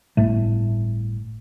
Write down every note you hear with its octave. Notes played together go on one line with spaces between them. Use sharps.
G1 A2 A3